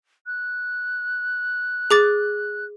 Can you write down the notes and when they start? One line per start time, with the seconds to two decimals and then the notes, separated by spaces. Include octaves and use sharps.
0.26 F#6
1.91 G#4 D6 A6